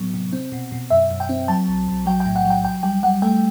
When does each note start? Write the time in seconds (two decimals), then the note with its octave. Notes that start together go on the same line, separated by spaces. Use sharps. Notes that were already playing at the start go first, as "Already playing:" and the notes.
Already playing: A2 F#3 B3
0.14 C3
0.33 C4
0.52 B2
0.72 B2
0.90 F#2 E5
1.10 F#2
1.20 G5
1.29 C4
1.48 F#3 A5
1.68 B1
1.87 B1
2.06 F#3 G5
2.20 G5
2.26 A2
2.36 F#5
2.45 F#3
2.50 G5
2.64 C2 G5
2.83 G3 G5
3.03 G3 F#5
3.22 A3 G5